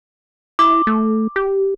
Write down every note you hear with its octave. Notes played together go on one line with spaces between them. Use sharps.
E4 D6
A3
G4